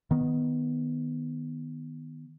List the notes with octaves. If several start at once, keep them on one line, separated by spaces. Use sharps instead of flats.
D#3 B3